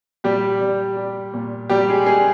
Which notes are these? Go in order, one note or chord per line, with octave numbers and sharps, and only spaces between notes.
A#2 G3 G4
G3
G3
A#2
A#2 G3 G4
G#3 G#4
G#3 A#3 G#4